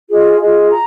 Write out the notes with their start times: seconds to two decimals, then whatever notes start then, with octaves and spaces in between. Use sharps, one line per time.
0.09 F4 G#4 D#5
0.40 F4 G#4 D#5
0.71 A#5